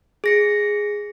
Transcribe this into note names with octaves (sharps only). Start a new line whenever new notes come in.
G#4 A#6 C#7